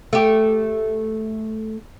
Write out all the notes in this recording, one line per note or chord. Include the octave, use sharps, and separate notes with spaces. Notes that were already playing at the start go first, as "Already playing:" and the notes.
A3 G4